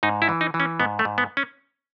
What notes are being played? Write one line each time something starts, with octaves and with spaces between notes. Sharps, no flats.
G#2 D#4
E4
E3
D#4
E3
C#4
G#2 B3
A3
G#2
B3
C#4